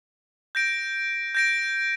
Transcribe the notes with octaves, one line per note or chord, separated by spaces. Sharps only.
G6 A#6 D7
G6 A#6 D7